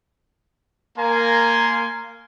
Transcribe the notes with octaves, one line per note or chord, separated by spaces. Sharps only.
A#3 A#4 F5 G#5 A#5 C6